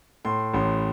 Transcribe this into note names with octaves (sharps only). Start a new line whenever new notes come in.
A2 C6
A1 C6